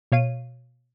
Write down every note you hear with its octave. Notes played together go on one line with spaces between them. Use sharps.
B2 C#5 F5 D#7